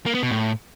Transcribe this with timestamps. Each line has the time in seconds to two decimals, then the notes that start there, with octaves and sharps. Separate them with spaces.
0.06 A#3
0.15 B3
0.23 B2
0.31 A2